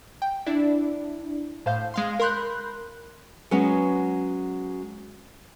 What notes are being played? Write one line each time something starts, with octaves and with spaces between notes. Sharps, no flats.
G5
D4 E4 D5
A2 C5 F5 G6
G#3 F5 C6
A#4 B5 C6 F#6 G6
F#3 G#3 B3 C#4